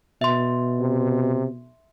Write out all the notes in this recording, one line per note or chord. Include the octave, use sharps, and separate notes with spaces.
B2 E5 C6
C3